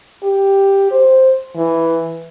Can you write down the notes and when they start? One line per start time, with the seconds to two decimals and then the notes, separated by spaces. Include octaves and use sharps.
0.23 G4
0.91 C5
1.56 E3